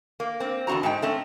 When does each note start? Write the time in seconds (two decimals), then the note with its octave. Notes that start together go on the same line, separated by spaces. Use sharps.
0.20 A#3
0.40 A#3 C4
0.67 E2 D3 C4 F#4 A#5
0.83 G#2 G#3 D#4 G5
1.02 A3 C4 C#4